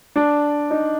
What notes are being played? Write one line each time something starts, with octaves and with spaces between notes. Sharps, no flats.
D4
D#4